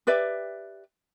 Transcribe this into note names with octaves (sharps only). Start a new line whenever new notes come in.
G4 B4 D5 E5